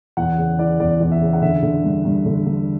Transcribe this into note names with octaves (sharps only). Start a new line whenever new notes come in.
E2 F#5
C#3
E3 D5
E2 D5
E2 D5
E5
C#3
F#5
D3 E5
D3
G2
G2
D3
D3